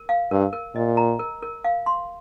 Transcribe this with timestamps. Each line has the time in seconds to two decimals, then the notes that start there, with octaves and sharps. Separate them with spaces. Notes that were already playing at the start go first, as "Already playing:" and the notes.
Already playing: A#4
0.09 F5
0.31 G2 A#4
0.53 A#4
0.75 A#2 D#5
0.97 A#5
1.19 A#4
1.42 A#4
1.64 F5
1.86 C6